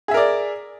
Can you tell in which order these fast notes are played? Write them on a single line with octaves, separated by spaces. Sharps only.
G#4 E5 A#4 D5